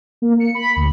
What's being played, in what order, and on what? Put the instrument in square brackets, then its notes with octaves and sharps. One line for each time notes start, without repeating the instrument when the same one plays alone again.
[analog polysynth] A#3
C#7
B5
D2